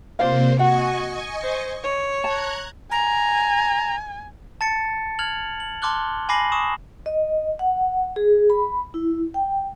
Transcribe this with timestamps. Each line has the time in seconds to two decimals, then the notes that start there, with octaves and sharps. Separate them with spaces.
0.19 C3 A#3 F4 C5 D5 F5
0.59 F#4 D#5 F#5 G#5 C#6
1.43 C5
1.84 C#5
2.24 A5 A#5 F#6 G#6
2.91 G#5 A#5
4.61 A5 A6 C#7
5.19 F6 G#6 F7 F#7
5.60 F#7
5.82 A5 C6 D6 F6 F#6 G7
6.29 G#5 B5 D6 A#6 C7 F#7
6.52 C#6 D#6 E7
7.06 D#5
7.59 F#5
8.16 G#4
8.50 B5
8.94 E4
9.34 G5